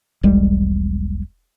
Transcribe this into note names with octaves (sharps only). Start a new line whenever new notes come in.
E1 B1 G3 G#3